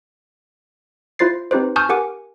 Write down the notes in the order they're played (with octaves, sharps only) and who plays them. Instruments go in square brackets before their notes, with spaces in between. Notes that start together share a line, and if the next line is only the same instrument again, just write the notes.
[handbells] E4 F4 C5 A6 C7
C4 D#4 G4 B4 C5
G#5 A5 C#6 D#6 F6 G6
G4 A#4 F#5 G#5 D6